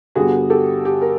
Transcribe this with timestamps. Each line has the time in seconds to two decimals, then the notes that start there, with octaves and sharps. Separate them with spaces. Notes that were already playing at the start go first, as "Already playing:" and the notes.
0.15 G2 D3 G3 B3 F#4 G#4
0.50 G4 A4
0.85 G4
1.01 A#4